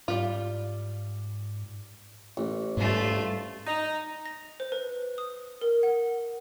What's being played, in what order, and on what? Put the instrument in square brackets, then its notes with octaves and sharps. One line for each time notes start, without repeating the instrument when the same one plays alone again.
[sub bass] G#2 [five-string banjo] G3 F4
[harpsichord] A1
[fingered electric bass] G#2 G3 [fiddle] A3 F4
[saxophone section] D#4
[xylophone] A#6
C5
B4
D#6
A#4
F#5